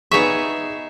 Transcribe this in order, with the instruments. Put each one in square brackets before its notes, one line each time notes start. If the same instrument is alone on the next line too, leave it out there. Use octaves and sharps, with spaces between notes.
[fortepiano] B3 G#4 C#6 [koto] D#4 C#5 E5